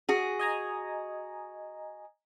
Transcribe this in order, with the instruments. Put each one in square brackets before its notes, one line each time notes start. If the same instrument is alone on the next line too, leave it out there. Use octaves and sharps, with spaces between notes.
[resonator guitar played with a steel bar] F#4 G#4
[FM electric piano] D#5 G#5 A#5